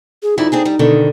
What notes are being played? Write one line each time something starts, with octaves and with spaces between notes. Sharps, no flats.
G#4
F2 D#4 E4 D5
C4 D4 G#4
G3
B2 D3 D#3